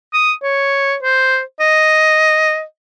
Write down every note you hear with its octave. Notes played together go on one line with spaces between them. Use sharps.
D#6
C#5
C5
D#5